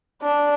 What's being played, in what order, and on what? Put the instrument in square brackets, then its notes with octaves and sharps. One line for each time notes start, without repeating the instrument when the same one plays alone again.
[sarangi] D4